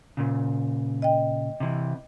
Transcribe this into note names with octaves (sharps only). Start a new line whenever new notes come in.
A#2 C#3
D#5 G5
C3 E3